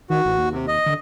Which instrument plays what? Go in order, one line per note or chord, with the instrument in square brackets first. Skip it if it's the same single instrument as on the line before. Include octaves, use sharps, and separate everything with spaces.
[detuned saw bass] D#3 [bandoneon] F#4
[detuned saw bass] A1
D#2
[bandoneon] C3
D#5
[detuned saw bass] D3